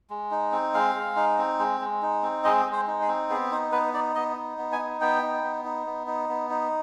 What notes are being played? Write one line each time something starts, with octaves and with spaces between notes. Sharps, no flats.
G#3
D#4
C4
G#3 F5
G#3
D#4
C4
G#3
G#3
D#4
C4
G#3 D#5
G#3
C5
D#4
G#4
C4
B3 G#4
D#4 C5
B3 B4
D#4 D5
B3 D#5
D#4
B3
G#5
D#4
B3 G5
D#4
B3
D#4
B3
D#4
B3
D#4